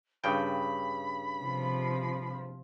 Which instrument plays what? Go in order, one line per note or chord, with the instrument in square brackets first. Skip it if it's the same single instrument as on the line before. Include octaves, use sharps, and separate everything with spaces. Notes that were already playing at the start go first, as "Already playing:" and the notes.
[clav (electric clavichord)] G2 C#3 G5 [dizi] B5
[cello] C3 F3